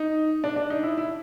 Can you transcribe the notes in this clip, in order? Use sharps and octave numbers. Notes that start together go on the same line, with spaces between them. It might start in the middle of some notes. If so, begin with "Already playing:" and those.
Already playing: D#4
D4
D4
D#4
E4
E4